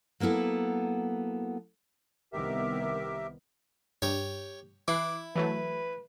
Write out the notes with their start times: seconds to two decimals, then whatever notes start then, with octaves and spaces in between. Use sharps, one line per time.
0.20 F#3 A#3 B3 E4 A4
2.33 C2 D#3 B3 G4 A#4 E5
4.02 G2 G4 C#5
4.88 E3 E4 D6 F#6 C7
5.36 E3 F#3 A3 B4